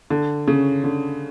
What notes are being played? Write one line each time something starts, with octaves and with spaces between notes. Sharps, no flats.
D3
C#3
D3